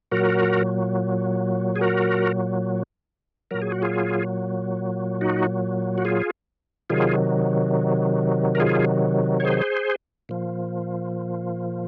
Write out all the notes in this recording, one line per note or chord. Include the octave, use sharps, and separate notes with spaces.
A#2 F#3 F#4 A#4
G#4
F#4 A#4
A#2 F#3 A#4
G#4
F#4
F4 G#4
D#4 F#4
F#4
F4 G#4
C3 D#3 F#3 F4 G#4
A#4
F4 G#4
C#5
G#4 C5
A#2 F3